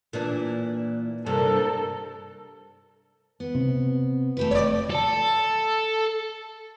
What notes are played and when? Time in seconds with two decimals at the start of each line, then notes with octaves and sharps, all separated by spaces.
0.13 A#2 E3 D4
1.26 G2 C3 G3 A4 A#4
3.40 B3
3.55 C3 C4
4.37 A3 G4 B4
4.51 F1 C#5 D5
4.90 A4 A5